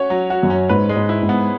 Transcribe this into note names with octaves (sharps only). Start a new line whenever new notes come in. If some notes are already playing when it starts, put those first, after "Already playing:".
Already playing: C#4 F#4 C#5
F#3
F#4
F#2
C#4
G#2 B4
G#3
G#2
E4
G#2
B3